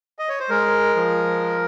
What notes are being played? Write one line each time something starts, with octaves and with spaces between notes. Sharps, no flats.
D#5
C#5
C5
G#3 A#4
F3